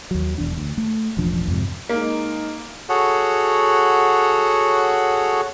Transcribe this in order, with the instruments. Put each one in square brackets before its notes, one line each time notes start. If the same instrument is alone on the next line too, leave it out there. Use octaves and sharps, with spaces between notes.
[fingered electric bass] D#2 F#3
E1 E2 D4
D2
A3
E1 A1 F3 D4
F2 G#2 C3
[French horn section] G#3 D#4 [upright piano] A#3
[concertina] F#4 G#4 A4 C#5 F#5